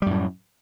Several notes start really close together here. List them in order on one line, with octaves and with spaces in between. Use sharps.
G3 F#2 A2